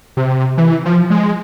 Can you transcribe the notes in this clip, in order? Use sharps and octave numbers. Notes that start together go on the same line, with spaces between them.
C3
E3
F3
G#3